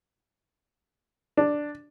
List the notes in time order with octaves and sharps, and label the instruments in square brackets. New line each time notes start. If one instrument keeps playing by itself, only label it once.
[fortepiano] D4